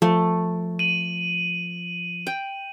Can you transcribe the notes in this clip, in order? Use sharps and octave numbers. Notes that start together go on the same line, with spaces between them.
F3 A3
D#7 F#7
G5